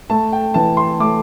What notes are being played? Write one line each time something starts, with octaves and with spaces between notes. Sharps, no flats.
A3 A5
G5
E3 A5
C6
A3 D6